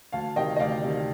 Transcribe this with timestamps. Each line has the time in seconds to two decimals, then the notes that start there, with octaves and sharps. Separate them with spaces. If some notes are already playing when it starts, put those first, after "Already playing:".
0.12 D2 F5 A5
0.36 C3 D#3 D#5 G5
0.57 D#5
0.60 D2 D5 F5
0.84 C3 D#3